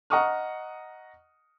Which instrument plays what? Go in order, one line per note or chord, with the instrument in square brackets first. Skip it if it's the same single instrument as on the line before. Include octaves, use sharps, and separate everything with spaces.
[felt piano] D#5 F#5 A#5 C#6 D#6 F6